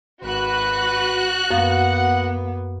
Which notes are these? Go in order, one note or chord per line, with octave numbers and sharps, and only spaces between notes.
G#1 F#4 B4 F#6
F#2 A#3 B3 F5 F#5